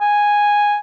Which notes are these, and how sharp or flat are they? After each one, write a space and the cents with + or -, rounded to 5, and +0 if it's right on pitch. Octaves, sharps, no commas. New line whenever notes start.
G#5 -5